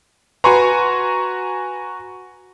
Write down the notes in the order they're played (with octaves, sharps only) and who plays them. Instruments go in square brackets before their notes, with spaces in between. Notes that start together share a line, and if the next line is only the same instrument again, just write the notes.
[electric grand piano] F#4 G#5 A#5 [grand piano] B4 C6 C#6